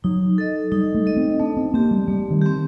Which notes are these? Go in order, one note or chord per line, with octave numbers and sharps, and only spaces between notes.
F#3 D#4
A4 D#5
G3 D#4
A3
A4 D#5
C4
A3 D4
C4
A#3 C4 G4
G3
G3 A3
D#3
C4 G4